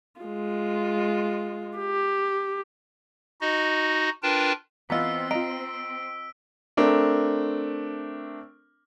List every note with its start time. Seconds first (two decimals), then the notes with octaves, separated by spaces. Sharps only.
0.21 G#3 F4
1.78 G4
3.41 D#4 F#4 D#5
4.23 D4 F4 A#4 B4 G5 A5
4.90 E3 B3 C4 F4 D#5 A#5 E6 B6
5.31 F4 D#5 A#5 D7
6.77 A3 C4 D4 A#4